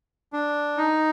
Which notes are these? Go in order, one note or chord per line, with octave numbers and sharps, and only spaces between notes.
D4
D#4